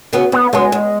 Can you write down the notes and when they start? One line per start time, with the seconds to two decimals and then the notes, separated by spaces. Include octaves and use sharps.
0.13 C#3 F#3 B3
0.32 E2 B3
0.53 C#3 F#3 G#3 B3
0.72 E2